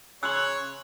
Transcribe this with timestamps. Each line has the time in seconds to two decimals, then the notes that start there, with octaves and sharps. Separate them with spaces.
0.23 C#3 C#5 C6 E6 F#6 F#7